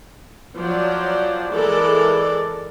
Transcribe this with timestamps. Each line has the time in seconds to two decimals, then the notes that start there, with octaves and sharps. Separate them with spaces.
0.56 F3 F#3 C5 D5
1.52 E3 G#3 A4 A#4 D5